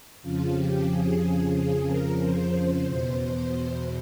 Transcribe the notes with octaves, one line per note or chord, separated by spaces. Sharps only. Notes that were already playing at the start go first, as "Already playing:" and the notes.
F2 C#3 F3 F4
G4
G#4
G#4
A#4
C5
E2 B2 C5
C5
C5